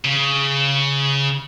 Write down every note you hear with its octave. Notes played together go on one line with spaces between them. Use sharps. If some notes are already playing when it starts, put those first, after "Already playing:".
C#3